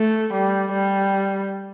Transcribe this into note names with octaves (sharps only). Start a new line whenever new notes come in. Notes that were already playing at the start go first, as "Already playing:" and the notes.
Already playing: A3
G3
G3